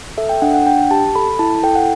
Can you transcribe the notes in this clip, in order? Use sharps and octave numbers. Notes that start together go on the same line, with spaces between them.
A4 E5
G5
D4 F#5
F#5
D4 G5
G4 A5
A4 B5
E4 A5
A4 G5
F#5